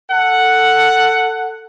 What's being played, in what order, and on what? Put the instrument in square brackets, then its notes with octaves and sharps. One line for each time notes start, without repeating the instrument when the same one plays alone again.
[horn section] A4 F#5